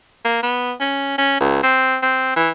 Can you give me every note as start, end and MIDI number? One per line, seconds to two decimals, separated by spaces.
0.25 0.39 58
0.43 0.72 59
0.80 1.15 61
1.18 1.37 61
1.40 1.62 37
1.63 1.97 60
2.02 2.32 60
2.36 2.50 52